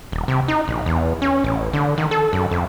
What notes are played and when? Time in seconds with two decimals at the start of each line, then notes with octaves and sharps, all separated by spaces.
0.12 D#1
0.28 C3
0.48 D#4
0.68 A#1
0.86 E2
1.22 C#4
1.44 A1
1.73 D3
1.98 D#3
2.11 A4
2.33 F#2
2.51 F2